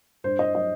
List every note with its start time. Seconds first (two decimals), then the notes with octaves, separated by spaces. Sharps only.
0.24 G2 C5
0.39 D#5
0.54 F#3 D#5